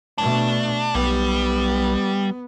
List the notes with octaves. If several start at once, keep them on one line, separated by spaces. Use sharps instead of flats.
B2 A3 D4
B1 G3 B3